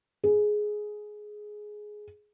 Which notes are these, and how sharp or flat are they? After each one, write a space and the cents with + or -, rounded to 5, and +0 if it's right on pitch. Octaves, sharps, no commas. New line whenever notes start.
G#4 +10